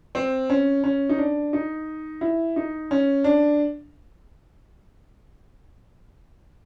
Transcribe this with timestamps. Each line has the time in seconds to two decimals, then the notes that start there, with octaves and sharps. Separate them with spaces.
0.15 C4
0.50 C#4
0.84 C#4
1.09 D#4
1.18 D4
1.53 D#4
2.21 E4
2.56 D#4
2.91 C#4
3.24 D4